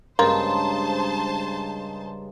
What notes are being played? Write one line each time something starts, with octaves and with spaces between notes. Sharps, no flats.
G2 C#3 G#3 A#3 C5 A5 A#5 C6